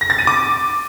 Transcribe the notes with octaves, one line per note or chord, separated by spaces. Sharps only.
A#6
A6
D#7
D6